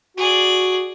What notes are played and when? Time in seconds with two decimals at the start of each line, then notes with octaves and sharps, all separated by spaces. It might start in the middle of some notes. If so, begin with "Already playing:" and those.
0.17 F#4 G#4 D5